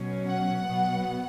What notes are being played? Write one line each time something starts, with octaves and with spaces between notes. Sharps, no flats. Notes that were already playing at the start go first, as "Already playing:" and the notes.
Already playing: B2 F#3 C#4
F#5
B2 F#3 B3